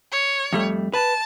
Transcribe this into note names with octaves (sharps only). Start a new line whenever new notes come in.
C#5
F2 G3 A3
B4 A5